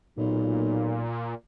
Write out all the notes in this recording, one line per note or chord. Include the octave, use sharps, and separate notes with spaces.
B1 A#2